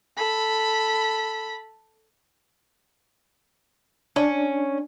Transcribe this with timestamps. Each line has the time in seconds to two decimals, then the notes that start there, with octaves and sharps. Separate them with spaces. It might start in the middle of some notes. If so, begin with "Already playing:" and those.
0.16 A4 B5
4.16 C#4 D4